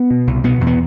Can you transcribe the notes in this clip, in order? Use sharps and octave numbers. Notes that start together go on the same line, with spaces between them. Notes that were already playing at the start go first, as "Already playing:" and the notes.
Already playing: B3
B2
C2
B2 B3
E2
B3